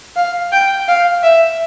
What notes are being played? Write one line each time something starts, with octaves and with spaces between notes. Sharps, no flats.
F5
G5
F5
E5